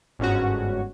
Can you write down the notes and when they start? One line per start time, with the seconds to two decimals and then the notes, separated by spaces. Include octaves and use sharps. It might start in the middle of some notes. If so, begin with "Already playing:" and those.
0.19 G1 G#2 C#4 F#4